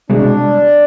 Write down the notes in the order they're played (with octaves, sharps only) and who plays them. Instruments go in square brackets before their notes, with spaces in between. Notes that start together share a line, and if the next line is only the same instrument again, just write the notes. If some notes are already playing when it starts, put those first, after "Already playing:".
[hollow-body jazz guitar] C2 B2 G#3 [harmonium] D4